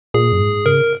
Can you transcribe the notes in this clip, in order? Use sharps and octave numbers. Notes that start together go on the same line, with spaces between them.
A#2 G#4
F#2
G#2
C#3 A#4